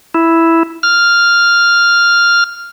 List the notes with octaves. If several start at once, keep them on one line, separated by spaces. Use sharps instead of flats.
E4
F6